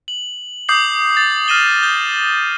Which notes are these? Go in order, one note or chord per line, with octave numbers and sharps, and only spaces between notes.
F#7
D6 D#6 G6 C7 F#7
A6
F6 A#6 D#7 E7 G7
G6 G7